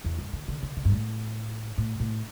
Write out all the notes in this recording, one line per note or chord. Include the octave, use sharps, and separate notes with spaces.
E2
G2
D3
D3
D3
D3
G2
A2
A2
A2